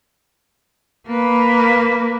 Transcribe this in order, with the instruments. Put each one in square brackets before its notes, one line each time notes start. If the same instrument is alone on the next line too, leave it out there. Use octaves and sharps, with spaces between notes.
[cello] A#3 B4